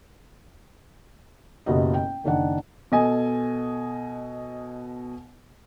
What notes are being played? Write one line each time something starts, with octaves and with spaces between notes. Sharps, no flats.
F#1 B2 B3 F#4 G4 D#5
G5
F#1 D#3 D4 F#5
B2 A4 D#5 G#5